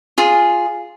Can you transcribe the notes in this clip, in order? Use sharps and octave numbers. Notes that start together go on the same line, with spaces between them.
F4 G#4